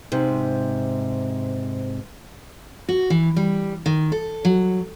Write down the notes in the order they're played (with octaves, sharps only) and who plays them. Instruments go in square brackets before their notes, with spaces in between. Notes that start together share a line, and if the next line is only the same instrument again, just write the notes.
[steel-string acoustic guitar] G#2 C3
F#4
E3
G3
D#3
A4
F#3